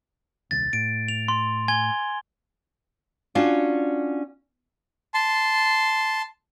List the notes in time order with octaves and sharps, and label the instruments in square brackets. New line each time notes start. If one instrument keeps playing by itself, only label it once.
[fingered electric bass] D#1 C2 [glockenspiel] A6
[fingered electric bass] A2 [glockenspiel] D7
[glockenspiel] F7
C6
G#5 G#6 G7
[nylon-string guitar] C#4 D4 F4 F#4 D5
[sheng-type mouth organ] A5 C6